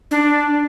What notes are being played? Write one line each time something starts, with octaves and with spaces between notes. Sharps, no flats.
D4